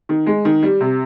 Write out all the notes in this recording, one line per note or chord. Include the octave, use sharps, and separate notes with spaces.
D#3
G#3
D#3
G3
C3